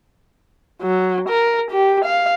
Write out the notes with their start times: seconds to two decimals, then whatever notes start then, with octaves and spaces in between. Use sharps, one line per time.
0.82 F#3
1.29 A#4
1.71 G4
2.04 F5